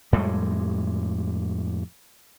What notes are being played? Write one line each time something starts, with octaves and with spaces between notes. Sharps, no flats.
F2 A2 G3 G#3